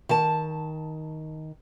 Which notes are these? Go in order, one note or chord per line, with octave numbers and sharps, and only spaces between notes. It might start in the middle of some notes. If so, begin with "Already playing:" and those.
D#3 A5